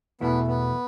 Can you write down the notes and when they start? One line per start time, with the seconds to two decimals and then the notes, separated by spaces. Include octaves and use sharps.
0.21 E2 B2 A3 B3 E4
0.48 B3